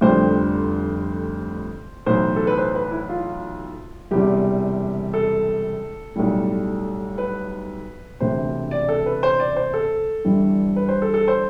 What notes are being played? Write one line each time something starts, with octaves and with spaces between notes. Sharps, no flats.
F1 F2 D3 G3 C5
B1 A2 E3 C5
A4
B4
C5
B4
E4
F4
E1 E2 C3 G3 G4
A4
B1 A2 G3
B4
E1 D2 C3 C5
D5
A4
B4
C5
D5
C5
A4
G1 G2 E3 G3
B4
C5
A4
A4
C5